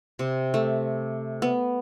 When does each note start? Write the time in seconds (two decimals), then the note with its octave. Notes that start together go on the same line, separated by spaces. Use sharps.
0.19 C3
0.54 A3
1.42 B3